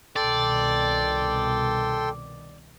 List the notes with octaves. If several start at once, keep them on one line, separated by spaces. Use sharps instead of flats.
C2 B2 D#3 A4 D5 G5 C6